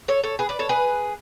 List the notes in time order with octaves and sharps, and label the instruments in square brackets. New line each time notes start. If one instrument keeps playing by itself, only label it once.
[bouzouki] A4 C#5
A4 C#5
G#4 B4
B4 D5
A4 C#5
G#4 B4